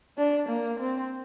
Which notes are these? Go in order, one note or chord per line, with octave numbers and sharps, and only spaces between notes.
D4
A#3
C4